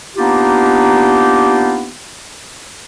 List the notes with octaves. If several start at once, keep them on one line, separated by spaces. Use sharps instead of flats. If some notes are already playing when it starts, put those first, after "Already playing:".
A#3 B3 D4 D#4 F4 G4